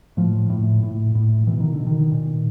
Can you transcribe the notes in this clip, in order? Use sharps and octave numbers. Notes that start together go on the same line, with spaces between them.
A2 F3
A2
A2
A2
B2 E3
D#3
D3
B2
D#3
A#2